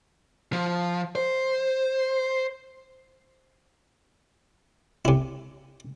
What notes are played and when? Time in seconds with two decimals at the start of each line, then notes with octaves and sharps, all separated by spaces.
0.53 F3
1.15 C5
5.05 C3 E4